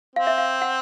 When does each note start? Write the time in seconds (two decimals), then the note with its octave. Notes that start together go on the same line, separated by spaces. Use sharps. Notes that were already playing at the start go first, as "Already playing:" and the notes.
0.16 C4 F5
0.27 E5
0.38 F5
0.62 F#5